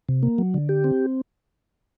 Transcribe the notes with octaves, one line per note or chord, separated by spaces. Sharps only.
C3
A#3
F#3
D3
G4
C4